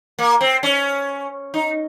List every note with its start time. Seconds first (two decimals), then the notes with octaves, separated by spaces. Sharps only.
0.19 A#3
0.41 C4
0.63 C#4
1.54 D#4